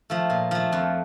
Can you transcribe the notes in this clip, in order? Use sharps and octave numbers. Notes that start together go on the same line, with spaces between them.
F3 A3
A#2
F3 A3
F2